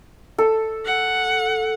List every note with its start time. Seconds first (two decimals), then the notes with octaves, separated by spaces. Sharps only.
0.38 A4
0.85 F#5